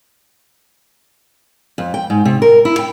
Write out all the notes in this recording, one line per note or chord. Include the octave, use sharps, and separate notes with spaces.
F2
G5
G#2
C3
A#4
E4
G5